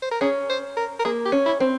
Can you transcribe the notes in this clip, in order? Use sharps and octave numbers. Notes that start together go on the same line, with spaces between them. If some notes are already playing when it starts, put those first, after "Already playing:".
C5
A#4
C#4 G#4
C5
A#4
A#4
A#3 G#4
G4
C#4
E4
C4